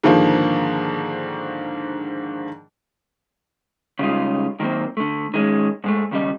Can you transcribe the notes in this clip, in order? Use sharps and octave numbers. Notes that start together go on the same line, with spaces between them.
G#2 D3 D#3 F3 A#3
C#3 G3 G#3 B3 D#4 F4
D#3 F#3 G3 A#3 C4
D3 A3
D#3 G#3 C#4
G#2 G#3 A3
D#2 C#3 G3 D#5